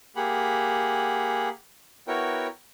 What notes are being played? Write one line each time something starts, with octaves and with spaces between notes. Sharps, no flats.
A#3 G4 G#4 F#5 B5
B3 E4 F#4 A#4 C#5 G5